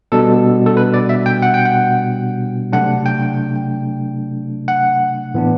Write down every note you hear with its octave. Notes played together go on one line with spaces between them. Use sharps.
B2 G3 D4 A4
A4
B4
D5
E5
G5
F#5
G5
F#5
C3 F#3 A3 D4 F#5
G5
F#5
A2 E3 B3 D4